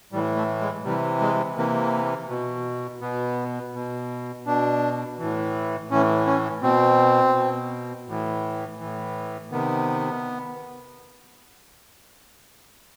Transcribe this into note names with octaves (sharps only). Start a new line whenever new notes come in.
A2 E3 G3
A3
G#3
C3 E3 G3
G#3
C3 E3 A#3
B2
B2 B3
B2
B2 D4
A2 E3
A2 E3 C#4
C#4
B2 C4
B2
A2 E3
A2 E3
C3 D#3 B3